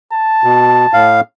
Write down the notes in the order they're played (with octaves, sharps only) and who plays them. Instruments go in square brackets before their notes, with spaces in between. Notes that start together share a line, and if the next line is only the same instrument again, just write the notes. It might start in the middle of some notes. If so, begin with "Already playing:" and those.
[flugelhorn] A5
[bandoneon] B2
A2 F5